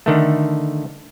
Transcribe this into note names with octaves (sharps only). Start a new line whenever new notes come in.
D3 D#3 A3